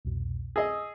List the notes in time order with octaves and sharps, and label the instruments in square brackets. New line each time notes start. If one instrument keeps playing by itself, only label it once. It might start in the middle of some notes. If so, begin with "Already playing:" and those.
[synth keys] C2 F2 B2
[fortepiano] G#4 D#5 [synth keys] E6